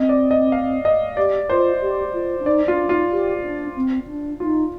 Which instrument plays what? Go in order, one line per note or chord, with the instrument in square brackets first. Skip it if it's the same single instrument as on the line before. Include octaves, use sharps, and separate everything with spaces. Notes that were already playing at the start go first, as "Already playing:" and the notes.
Already playing: [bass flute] C4 [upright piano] D#5
[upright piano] D5
D#5
F5
D#5
[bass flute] G4 [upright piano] D5
[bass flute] F4 [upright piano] C5
[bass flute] G4
F4
D4
[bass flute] D#4 [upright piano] D5
[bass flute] D4 [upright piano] F4
[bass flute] D#4 [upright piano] F4
[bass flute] G4
D4
C4
D4
[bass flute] D#4 [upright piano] F4